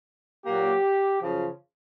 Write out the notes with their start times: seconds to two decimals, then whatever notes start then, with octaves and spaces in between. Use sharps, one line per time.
0.46 A#2 F#3 A#3 G4
1.20 F#2 C#3 F3